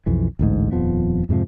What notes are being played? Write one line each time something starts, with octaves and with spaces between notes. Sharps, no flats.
B1 F2 E3
A1 D2 G#2
D#1 F2 F3 B3
F2 G#2 C3 F3